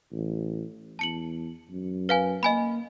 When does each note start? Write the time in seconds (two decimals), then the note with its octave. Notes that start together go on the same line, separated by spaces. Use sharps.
0.12 A1
0.99 E2 A5 C#7 F#7
1.70 F#2
2.09 B4 F5 G#5
2.43 A#3 D#5 G#5 B5